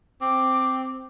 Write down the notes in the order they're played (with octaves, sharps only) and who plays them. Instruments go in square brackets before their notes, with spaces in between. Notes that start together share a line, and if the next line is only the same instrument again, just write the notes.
[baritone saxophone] C4 [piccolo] D6